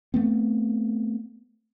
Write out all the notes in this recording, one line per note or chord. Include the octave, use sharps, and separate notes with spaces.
A3 B3 C4